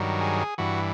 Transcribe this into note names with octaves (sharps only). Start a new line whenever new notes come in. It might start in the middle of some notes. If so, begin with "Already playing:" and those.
Already playing: G2 D#3 F#3
G#4
G2 E3 F#4